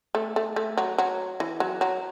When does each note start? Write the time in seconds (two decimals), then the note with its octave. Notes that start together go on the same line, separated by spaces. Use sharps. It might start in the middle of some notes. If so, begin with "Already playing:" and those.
0.15 A3
0.36 A3
0.56 A3
0.77 F#3
0.98 F#3
1.40 E3
1.60 F#3
1.81 F#3